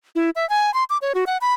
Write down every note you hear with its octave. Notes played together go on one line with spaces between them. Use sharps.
E4
E5
G#5
C6
D6
C#5
F#4
F#5
B5